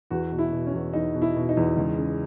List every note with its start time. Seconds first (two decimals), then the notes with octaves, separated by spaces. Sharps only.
0.11 E2 F#4
0.32 B2
0.39 E4
0.52 B2
0.66 C#4
0.74 E2
0.93 E2 D#4
1.14 B2
1.22 E4
1.36 B2
1.49 D#4
1.57 E2
1.77 C#2
1.98 C#3